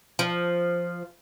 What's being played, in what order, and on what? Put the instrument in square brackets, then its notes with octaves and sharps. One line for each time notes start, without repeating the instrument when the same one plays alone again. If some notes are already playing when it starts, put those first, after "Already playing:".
[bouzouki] F3